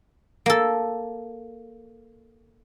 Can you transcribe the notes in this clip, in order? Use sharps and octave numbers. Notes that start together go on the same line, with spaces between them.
A#3 A4